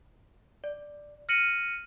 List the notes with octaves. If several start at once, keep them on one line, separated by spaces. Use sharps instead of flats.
D5
F6 A#6 C#7 D#7 F#7